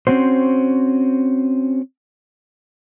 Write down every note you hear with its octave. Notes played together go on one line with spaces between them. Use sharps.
C4 C#4 F#4 C5